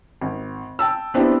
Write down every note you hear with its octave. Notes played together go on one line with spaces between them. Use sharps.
G#1
G5 A5 E6
B3 C4 D4 E4 G4